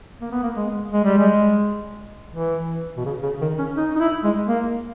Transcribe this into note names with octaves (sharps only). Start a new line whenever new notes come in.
A#3
B3
A#3
G#3
G#3
G3
G#3
E3
B2
C#3
C#3
D#3
C#4
D#4
D#4
E4
G#3
A#3